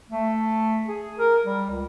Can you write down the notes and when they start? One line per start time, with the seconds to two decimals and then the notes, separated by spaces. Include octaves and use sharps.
0.10 A3
0.88 G#4
1.18 A#4
1.45 G3
1.70 C#2